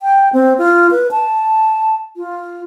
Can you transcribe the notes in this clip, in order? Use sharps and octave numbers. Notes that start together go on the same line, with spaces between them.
G5
C4
F4
B4
A5
F4